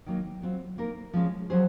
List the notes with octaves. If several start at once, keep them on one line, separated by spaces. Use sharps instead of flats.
D#3 F#3 A#3 D#4
F#3 C4 F4
A#3 D#4 A#4
F3 G#3 C#4 F4
F#3 C#4 G#4 C5